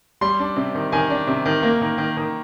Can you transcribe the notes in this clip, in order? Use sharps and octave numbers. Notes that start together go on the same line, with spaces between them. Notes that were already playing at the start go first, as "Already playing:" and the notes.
G3 C6
D4
C3
D#3
D#3 G#5
D4
C3
D#3
A#3
D#3
D#3
D#3